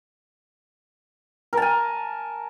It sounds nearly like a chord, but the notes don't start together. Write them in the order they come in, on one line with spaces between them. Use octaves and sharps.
A#4 A5 G#5